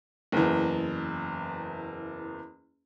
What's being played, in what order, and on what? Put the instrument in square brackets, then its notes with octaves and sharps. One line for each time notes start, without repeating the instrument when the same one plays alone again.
[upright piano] F#1 E2